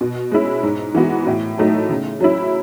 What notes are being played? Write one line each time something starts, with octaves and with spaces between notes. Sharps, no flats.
B2
G#3 C#4 E4
G#2
E3 B3 F#4
A2
F#3 A3 D#4
C#3
F#3 C#4 E4